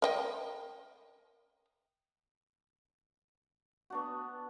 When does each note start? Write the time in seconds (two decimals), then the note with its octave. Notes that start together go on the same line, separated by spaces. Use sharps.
0.02 A#4 D#5 G5
3.90 B3 D4 F#4